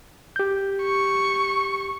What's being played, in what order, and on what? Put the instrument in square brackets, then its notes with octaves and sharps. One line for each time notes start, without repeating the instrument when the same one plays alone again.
[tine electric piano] G4 G6
[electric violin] C#6